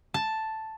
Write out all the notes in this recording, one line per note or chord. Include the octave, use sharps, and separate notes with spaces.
A5